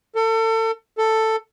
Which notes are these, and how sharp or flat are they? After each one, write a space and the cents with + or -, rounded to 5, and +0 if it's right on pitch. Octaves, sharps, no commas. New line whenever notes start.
A4 +35
A4 +10